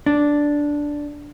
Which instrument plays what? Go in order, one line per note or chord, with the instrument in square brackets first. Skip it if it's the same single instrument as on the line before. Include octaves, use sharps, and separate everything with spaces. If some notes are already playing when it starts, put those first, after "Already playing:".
[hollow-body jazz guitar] D4